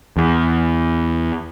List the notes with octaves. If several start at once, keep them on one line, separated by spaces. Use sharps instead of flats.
E2